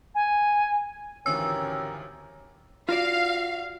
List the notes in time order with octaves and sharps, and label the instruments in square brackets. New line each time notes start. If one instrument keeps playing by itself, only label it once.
[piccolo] G#5
[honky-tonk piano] G#1 D2 E3 [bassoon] C#4 [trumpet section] G4 A#4 [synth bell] E6
[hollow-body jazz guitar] F4 F#4 D5 [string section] F5